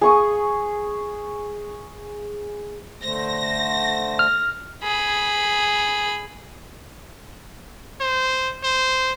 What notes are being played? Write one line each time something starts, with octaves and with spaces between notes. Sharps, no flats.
G#4 C#6 D#6
D3 A3 C5 A#6
F6
G#4 B5
C5
C5